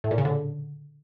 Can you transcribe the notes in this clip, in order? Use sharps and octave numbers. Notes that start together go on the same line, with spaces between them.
A2
A#2
C#3
D3